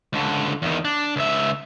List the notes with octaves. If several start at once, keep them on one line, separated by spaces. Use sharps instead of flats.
C#2 D3
E2 D#3
D4
C#2 E5